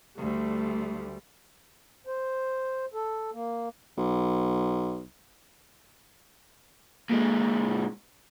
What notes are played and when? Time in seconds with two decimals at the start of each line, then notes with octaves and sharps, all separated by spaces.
0.18 D2 G3 A3
2.07 C5
2.94 A4
3.34 A#3
3.97 B1
7.10 A#2 G#3